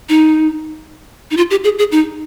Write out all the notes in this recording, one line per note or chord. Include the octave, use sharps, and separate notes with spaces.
D#4
D#4
F4
G4
G#4
G#4
D#4